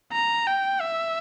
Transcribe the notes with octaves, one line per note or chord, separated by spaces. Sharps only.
A#5
G5
E5